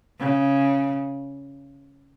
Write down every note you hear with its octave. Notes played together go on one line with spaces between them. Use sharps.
C#3